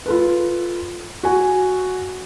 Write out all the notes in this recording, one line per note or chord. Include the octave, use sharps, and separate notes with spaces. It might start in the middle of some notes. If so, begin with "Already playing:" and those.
F4 A4 B4
F#4 G#5